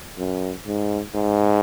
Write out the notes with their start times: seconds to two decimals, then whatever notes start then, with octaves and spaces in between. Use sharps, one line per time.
0.18 F#2
0.67 G#2
1.15 G#2